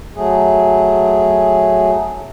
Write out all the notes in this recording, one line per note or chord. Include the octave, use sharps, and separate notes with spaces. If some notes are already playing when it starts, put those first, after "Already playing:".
F#3 A3 G#4